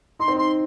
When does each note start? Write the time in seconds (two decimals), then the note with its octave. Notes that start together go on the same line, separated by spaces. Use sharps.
0.20 D#4 C6
0.28 C4
0.36 D#4 C6